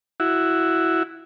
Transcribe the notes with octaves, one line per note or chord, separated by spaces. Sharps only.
E4 F#4